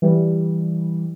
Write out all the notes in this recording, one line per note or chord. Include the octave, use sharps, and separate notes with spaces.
E3 G3